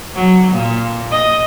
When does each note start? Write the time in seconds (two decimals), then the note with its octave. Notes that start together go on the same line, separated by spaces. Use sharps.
0.16 F#3
0.51 A#2
1.11 D#5